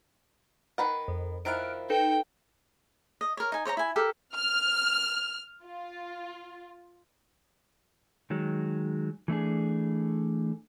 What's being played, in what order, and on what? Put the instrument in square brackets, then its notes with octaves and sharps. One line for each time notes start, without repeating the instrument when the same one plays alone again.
[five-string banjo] D#3 B4 F#5
[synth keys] F2
[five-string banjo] D#3 F3 E4 [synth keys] F6 F#6 D7
[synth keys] D#4 A4 B4 [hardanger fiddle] G5
[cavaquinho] D#5
A#4 C#5
D#4 G#5
C5 C#5 D#5 A#5
E4 G#5
G4 A4 A#4
[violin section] F6
F4
[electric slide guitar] D#3 F#3 G#3
E3 A3 D4 G#4